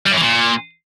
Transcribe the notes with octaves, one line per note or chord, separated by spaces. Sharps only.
G3
F#2
E3
A#2